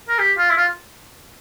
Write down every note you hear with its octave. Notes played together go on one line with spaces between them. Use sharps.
A#4
G4
F4
E4
F4